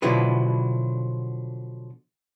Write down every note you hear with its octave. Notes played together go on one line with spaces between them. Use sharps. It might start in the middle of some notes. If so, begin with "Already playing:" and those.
B2 D3 F3 F#3 E4 B4